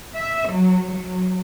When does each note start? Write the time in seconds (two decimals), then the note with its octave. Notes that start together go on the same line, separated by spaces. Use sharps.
0.15 E5
0.48 F#3
0.93 F#3